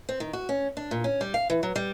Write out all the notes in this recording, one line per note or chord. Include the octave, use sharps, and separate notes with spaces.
C4
D#3
F#4
C#4
D4
A#2
C#4
G3
F5
E3
F#3
G3